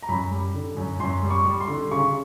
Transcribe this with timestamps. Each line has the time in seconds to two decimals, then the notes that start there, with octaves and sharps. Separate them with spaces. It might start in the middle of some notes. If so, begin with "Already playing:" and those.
0.02 A#5
0.09 F#2 B5
0.31 G3
0.54 D3
0.77 F#2
1.00 F#2 C6
1.23 G3
1.31 C#6
1.45 G3
1.61 C6
1.68 D3
1.91 C#3 C#6